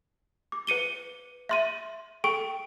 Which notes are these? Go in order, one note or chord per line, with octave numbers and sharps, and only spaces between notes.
D6
B4 C#7 D#7 G7
E5 C6 D#7
A4 G5 C#6 D7